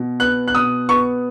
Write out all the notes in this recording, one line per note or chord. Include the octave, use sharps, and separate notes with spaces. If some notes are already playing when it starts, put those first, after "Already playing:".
Already playing: B2
B3 F#6
F#6
B2 D#6
B3 C#6